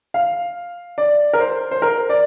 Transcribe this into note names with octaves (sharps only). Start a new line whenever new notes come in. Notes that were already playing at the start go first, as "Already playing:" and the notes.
F5
D5
A#4
C5
C5
A#4
D5